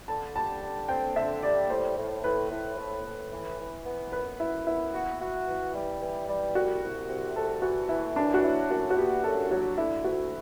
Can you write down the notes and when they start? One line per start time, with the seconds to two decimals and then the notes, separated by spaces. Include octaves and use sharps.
0.08 D3 A5
0.36 G3 A5
0.62 D3
0.88 C4 G5
1.16 D3 E5
1.43 G3 D5
1.70 A2 C5
1.96 A2
2.24 A2 B4
2.51 A2
2.77 A2
3.05 A2
3.31 E3
3.59 E3
3.85 B3
4.12 F#2 B4
4.39 F#2 E4
4.66 B3 E4
4.93 F#4
5.20 F#4
5.48 E3
5.74 G3
6.01 E3
6.28 G3
6.55 C2 F#4
6.82 C2
7.08 C3
7.35 C2 A4
7.62 E3 F#4
7.89 E3 E4
8.16 F#2 D4
8.34 F#4
8.44 F#3 E4
8.70 F#2 F#4
8.90 F#4
8.97 B3 G4
9.24 F#2 A4
9.51 F#3 F#4
9.78 D3 E4
10.04 D2 F#4